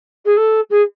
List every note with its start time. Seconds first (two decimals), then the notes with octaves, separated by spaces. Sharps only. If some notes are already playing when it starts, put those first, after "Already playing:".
0.25 G#4
0.36 A4
0.70 G#4